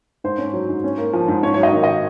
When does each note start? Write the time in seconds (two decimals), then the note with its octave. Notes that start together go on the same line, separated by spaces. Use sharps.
0.24 G#2 C5
0.38 C#4
0.53 F#3
0.69 G#2
0.84 C#4
0.98 A#3
1.13 F3
1.28 G#2
1.42 C#4 C#5
1.54 F#3 C#5
1.63 D#5
1.73 D#3
1.83 D#5